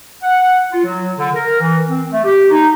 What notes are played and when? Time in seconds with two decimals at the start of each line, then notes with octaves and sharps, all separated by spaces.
0.23 F#5
0.72 F4
0.84 F#3
1.18 D3
1.34 A#4
1.61 E3
1.88 C4
2.12 A3
2.24 G4
2.50 D#4